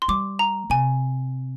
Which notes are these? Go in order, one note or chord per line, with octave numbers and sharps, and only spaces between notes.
C6
G3 D6
A#5
C3 G#5